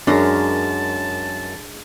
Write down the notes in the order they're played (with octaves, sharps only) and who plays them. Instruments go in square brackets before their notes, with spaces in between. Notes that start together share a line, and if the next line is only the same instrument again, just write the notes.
[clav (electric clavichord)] F#2 [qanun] G#3 A#4 B5 [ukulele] D4 [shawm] A5